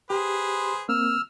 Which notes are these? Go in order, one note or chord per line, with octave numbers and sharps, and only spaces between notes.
G4 G#4 B4 C5
A#3 C4 E6 F6